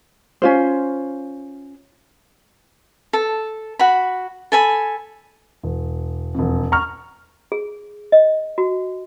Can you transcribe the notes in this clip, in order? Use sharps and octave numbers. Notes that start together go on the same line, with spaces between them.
C#4 F4 C5
A4
F#4 B5
A4 G#5 B5
E1
E1 F2
A#5 C#6 F6
G#4
D#5
F#4